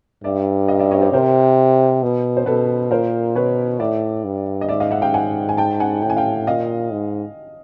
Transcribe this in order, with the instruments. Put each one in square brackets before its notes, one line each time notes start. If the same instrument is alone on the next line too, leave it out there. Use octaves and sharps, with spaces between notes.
[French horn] G2 [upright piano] D5 E5
[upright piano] D#5 F5
D5 E5
C#5 D#5
C5 D5
[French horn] C3 [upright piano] A#4 C5
[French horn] B2
[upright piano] C5
[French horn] B2 [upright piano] A4 B4
[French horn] A#2 [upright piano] A#4 C5
[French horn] B2 [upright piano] B4 C#5
[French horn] A2 [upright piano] D5 E5
[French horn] G2
[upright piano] D#5
[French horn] G#2 [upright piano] D5 E5
[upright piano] D#5 F5
E5 F#5
F5 G5
F#5 G#5
G#5
G5 A5
F#5 G#5
[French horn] A2 [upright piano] G5
[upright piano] G#5
F5 G5
[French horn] A#2 [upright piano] D#5 F5
[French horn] G#2